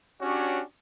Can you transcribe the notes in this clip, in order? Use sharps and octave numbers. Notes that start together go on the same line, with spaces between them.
C#4 D4 F#4 G4 C#5